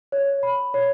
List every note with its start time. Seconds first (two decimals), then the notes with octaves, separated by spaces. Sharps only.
0.12 C#5
0.43 B5
0.74 C#5